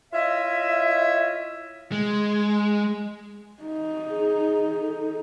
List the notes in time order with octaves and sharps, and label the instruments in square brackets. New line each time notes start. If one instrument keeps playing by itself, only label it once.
[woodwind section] E4 F4 C#5 D#5 E5
[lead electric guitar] G#3
[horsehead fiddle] D#4
[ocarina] G#4
A4